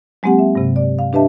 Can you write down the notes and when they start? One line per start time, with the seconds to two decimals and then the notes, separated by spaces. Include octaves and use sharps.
0.23 F#3 G#3 A#3 C4 G4 F#5
0.39 E5
0.55 G2 C3
0.76 D5
0.99 F5
1.13 D4 G4 B4 D#5 E5 A5